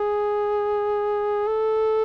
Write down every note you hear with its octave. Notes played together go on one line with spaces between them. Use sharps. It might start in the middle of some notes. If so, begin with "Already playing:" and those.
Already playing: G#4
A4